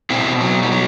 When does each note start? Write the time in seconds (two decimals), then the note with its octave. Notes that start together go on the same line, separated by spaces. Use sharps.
0.10 B2 C4 E4
0.41 F#3
0.62 G3
0.71 F#3